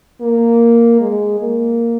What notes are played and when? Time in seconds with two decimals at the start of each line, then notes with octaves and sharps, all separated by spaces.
0.21 A#3
1.01 G#3
1.40 A#3